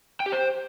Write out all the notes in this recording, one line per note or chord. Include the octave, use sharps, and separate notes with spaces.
G5
G4
C5